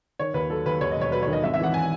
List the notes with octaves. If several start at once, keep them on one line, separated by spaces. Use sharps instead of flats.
D#3 C#5
D#2 B4
F#3 A4
D#2 B4
D#2 C#5
D#5
E1 C#5
F#3 B4
C#5
D#3
D#5
G#1 E5
E5
E3 F#5
G#5